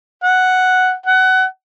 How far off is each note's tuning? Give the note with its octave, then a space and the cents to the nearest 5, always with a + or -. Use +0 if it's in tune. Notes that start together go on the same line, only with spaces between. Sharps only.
F#5 +0
F#5 +20